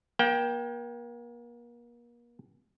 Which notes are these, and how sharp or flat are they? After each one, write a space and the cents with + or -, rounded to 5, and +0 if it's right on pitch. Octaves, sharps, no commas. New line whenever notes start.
A#3 +35 G5 +5